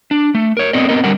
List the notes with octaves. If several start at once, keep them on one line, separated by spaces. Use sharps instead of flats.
D4
A3
A#4 C#5
B3 C4 A4 D5 D#5
B3 C4 A#4 D#5
D3 G3 G4 A#4 F#5